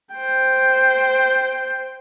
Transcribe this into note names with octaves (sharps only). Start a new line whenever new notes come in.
C5 G5